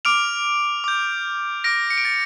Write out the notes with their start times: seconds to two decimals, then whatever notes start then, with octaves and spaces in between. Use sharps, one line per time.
0.05 D6 F6 D7 F7
0.84 D6 G6
1.64 D6 F6 A#6 D7
1.90 C#7
1.98 D7
2.05 A6 C#7